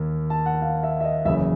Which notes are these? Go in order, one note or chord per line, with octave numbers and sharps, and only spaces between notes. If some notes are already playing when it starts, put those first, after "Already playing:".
Already playing: D#2 A#3
A5
F#5
F5
E5
E5
D#5
F#1 E2 C#3 E5